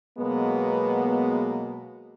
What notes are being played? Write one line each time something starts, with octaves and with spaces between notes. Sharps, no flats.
B2 F#3 G#3 A#3 B3